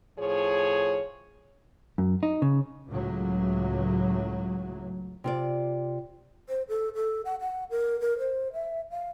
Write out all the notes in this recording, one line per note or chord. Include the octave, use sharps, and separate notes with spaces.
A2 F3 G#4 C#5
F#2
D#4
C#3
C#2 A2 F#3
C3 F4 D5
C5
A4
A4
F#5
F#5
A#4
A#4
C5
E5
F5